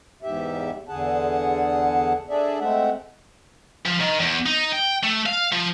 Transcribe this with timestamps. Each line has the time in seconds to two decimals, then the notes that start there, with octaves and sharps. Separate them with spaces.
0.23 E2 G#2 G4 E5
0.89 E2 D3 G#4 F#5 A5
2.29 D4 G#4 A4 D5 E5
2.60 G#3 A3 C4 E5 F#5
3.86 F3
4.01 D#3
4.20 E2
4.46 D#4
4.72 G5
5.03 A3
5.26 F5
5.53 F3